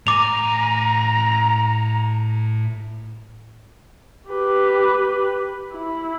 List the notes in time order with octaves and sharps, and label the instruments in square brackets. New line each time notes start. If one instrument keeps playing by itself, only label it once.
[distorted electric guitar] A2 G#5 [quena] A#5 [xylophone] D6 F7
[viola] G4 B4
E4